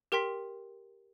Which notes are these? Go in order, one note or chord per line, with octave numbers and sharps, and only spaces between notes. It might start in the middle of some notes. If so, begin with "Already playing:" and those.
G4 A#4 G5 C6 B6